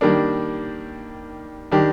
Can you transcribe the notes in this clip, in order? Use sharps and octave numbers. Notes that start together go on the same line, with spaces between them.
D#3 G3 A#3 D4
D#3 G3 D4 G4